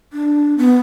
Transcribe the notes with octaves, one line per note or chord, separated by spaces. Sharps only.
D4
B3